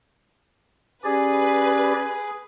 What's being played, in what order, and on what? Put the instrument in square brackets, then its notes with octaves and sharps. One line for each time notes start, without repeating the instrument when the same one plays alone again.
[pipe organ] C#4 G4 D5 [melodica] G#4 [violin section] B4